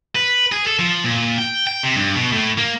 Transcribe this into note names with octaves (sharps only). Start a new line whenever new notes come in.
B4
G#4
A4
F3
A#2
G5
G5
C3
G2
B2
A2
A#3